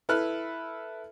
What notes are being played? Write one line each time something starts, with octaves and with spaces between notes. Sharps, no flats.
E4 A4 B4 F6 F#6